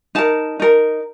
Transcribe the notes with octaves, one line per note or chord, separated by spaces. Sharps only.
D#4 A#4 A5
D#4 A#4